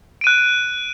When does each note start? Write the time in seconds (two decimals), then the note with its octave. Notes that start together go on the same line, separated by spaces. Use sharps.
0.21 D7
0.24 D#7
0.27 F#6